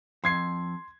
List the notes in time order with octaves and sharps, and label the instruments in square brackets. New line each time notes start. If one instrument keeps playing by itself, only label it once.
[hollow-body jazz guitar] F2 [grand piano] C6 G#6 C7